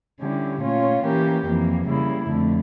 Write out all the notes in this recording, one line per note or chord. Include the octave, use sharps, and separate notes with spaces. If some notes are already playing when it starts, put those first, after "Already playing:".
D3 G3 C#4 E4 G4
A#2 A3 C#4 F4 C#5
E3 A#3 C#4 G4 A#4
F2 E3 A#3
C#3 G3 A#3 E4
F2 D3 A3